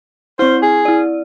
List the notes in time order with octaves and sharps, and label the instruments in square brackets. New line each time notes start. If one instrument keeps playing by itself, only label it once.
[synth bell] C4 E4 [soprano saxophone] C5
[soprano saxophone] G#4
[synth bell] E4 D5